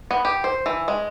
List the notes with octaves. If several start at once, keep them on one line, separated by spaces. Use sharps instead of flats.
B3
G4
C5
E3
G#3